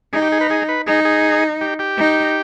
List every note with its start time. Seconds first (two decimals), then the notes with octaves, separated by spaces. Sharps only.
0.13 D#4 G#4
0.22 G4
0.32 G#4
0.41 B4
0.50 G#4
0.69 B4
0.87 D#4 G#4
1.05 G#4
1.61 G4
1.79 G4
1.98 D#4